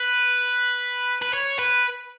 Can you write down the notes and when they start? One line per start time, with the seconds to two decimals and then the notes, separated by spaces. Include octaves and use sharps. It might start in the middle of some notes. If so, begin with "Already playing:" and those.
Already playing: B4
1.22 B4
1.34 C#5
1.59 B4